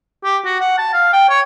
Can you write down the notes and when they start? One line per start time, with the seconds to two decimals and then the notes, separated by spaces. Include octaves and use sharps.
0.24 G4
0.45 F#4
0.60 F#5
0.78 A5
0.94 F5
1.13 G5
1.29 C#5